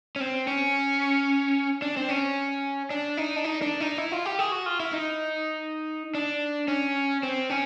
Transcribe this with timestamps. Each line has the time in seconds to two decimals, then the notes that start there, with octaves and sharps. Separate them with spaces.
0.16 C#4
0.20 C4
0.47 C#4
1.82 D4
1.97 C4
2.09 C#4
2.90 D4
3.17 D#4
3.36 D4
3.44 D#4
3.62 D4
3.80 D#4
3.98 E4
4.12 F4
4.25 G4
4.39 G#4
4.52 F#4
4.66 F4
4.80 E4
4.92 D#4
6.15 D4
6.68 C#4
7.23 C4
7.50 C#4